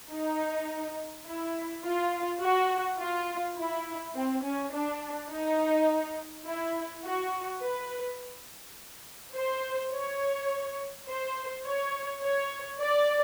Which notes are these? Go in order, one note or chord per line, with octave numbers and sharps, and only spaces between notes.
D#4
E4
F4
F#4
F4
E4
C4
C#4
D4
D#4
E4
F#4
B4
C5
C#5
C5
C#5
C#5
D5